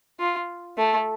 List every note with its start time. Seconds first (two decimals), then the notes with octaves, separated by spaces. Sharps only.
0.19 F4
0.78 A3